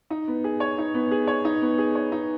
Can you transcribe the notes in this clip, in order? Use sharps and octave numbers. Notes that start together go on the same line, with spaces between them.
D#4
B3
G#4
C#5
D#4
B3
G#4
C#5
D#4
B3
G#4
C#5
D#4